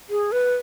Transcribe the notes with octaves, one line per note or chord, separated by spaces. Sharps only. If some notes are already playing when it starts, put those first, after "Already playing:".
G#4
B4